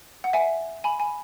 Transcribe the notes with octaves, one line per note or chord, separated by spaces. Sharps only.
F#5
E5 G#5
G#5 B5
G#5 B5